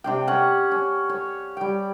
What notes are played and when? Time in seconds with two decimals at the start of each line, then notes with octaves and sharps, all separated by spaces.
0.04 C3 D4 G5
0.27 C#4 F#5
0.71 C#4
1.10 C#5
1.57 G3 G5